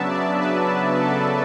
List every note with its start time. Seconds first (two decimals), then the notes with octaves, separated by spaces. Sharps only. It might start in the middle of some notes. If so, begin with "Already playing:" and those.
Already playing: C#3 F#3 B3 D4 E5 A5
0.10 D5
0.40 B4
1.01 A4